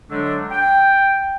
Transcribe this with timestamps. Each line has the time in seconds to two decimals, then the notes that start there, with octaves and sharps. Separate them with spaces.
0.10 D3 F#3 G#3 A3 D4
0.51 G5